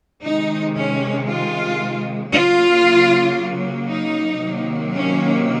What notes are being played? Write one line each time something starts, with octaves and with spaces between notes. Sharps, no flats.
C3 D#3 G#3 D#4
C#4
F4
C#3 F#3 A#3 F4
D#4
C3 D#3 F#3 A#3
C#4